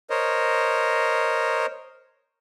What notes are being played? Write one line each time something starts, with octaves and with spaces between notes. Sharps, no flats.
A#4 C5 C#5 D#5